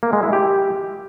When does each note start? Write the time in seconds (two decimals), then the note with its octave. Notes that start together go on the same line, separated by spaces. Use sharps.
0.03 A#3
0.13 G#3
0.23 E4
0.33 G4